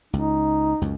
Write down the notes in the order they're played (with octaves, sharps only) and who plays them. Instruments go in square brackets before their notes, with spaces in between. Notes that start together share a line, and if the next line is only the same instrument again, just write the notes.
[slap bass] C#2 [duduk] D#4
[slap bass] C#2 F#2